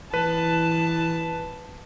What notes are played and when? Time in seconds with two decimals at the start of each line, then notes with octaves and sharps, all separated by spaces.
0.14 E3 B4 A5